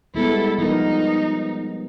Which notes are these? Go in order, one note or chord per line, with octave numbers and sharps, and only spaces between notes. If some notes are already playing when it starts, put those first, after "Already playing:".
G3 G#3 B3 E4 A4
F3 B3 D#4 A#4